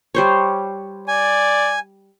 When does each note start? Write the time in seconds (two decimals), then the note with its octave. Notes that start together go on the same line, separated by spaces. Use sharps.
0.15 G3 C5 C#5
1.08 D5 G#5